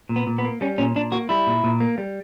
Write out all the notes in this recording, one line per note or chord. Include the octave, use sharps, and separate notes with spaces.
A#2
B3
A#2
B3
A#3
G3 C#4
A#2 C#4
A#2 D4
A#3 F#4
G3 E4
A#2
A#2
A#3
G3